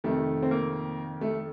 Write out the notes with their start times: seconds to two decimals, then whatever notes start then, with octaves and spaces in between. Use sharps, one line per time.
0.04 F2 C3 D#3 A3
0.43 C4
0.51 A#3
1.21 A3